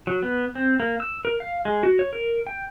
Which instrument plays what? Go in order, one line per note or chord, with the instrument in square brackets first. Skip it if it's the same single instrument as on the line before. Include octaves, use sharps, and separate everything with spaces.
[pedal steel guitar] F#3
B3
C4
A#3
E6
A#4
F5
G#3
F#4
C#5
A#4
G5